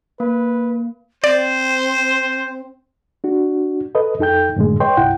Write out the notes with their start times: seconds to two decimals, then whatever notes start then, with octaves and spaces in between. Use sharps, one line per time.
0.20 A#3 B4
1.24 C4 C5 D5
3.24 D4 F#4
3.95 A4 B4 D#5
4.19 F2 D#4 A4 G5 G6
4.56 F#2 A2 D3 G#3
4.80 B4 C#5 D#5 G5 C6
4.97 C2 G2 E4 F#5 G5